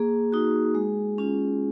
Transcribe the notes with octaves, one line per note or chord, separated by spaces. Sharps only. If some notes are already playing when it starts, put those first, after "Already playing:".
Already playing: A#3 G#4
D#4 F#4
G#3
C#4 F4